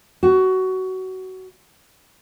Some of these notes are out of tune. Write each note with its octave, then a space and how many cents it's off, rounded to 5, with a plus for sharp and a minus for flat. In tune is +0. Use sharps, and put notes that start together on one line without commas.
F#4 +20